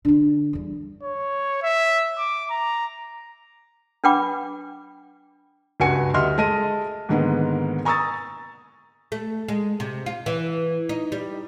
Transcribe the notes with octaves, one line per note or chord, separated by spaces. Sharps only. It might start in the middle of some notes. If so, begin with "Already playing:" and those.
D3 D4
E2 G3
C#5
E5
D6
A#5
D4 B4 F#5 G5 B5 D6
C#2 G2 F#4 G#5 C#7
D2 G3 D#5 E5 C6 F6
G#3 A4 D#5 A5 A#6 D#7
G#2 D3 D#3 G#3 A#3 B3
G#5 A#5 C#6 D#6 E6 A6
A3
G#3
C3
F4
E3
D#4
G3